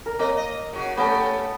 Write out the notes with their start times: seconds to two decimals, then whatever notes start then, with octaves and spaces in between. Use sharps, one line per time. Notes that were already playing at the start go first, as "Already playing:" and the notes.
0.06 A#4
0.19 A#3 C4 D#5
0.37 D#5
0.73 C#3 F#4
0.97 A3 B3 C#4 G4 A4